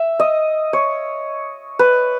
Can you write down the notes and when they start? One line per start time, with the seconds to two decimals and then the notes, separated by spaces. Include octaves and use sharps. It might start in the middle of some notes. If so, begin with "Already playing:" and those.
Already playing: E5
0.20 D#5
0.73 C#5
1.79 B4